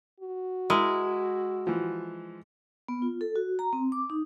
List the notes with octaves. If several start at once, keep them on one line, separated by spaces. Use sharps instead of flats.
F#4
G#3 E4 A#4 D#5
E3 F3
B3
F4
A4
F#4
A#5
C4
D6
D#4